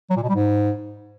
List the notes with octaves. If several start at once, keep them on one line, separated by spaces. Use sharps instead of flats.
F#3
A#2
B2
G3
G#2